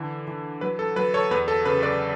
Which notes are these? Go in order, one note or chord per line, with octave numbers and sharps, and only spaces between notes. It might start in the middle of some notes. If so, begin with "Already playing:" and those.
Already playing: D3 E3
E3
F#3 B4
A4
F#3 B4
A4 C#5
E2 B4
A4
C#3 B4
B4 D5